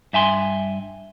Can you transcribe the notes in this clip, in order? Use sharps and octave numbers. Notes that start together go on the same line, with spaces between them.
G2 E5 G#5 C6